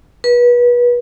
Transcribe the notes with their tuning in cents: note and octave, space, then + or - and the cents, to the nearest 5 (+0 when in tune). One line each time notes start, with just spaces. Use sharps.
B4 -30